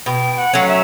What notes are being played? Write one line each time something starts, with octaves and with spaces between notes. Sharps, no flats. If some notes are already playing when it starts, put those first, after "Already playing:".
B2 G5
F#5
F#3 A3 C#4
E5